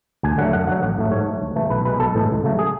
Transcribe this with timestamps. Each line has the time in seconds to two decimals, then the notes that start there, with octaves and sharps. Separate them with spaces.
0.23 D2 G#5
0.38 D3 F#3 A3 F#5
0.53 F#2 F#5
0.67 D3 F#3 F#5
0.82 A1 F#5
0.98 A2 F#3 A3
1.11 G#2 C#5
1.26 F#3 A3
1.41 D2
1.56 C#3 E3 A3
1.70 B1 B4
1.85 B2 G#3 B4
1.99 B1 A4
2.15 A2 E3 G#3
2.30 C#2
2.44 C#3 F#3 A3
2.59 G#4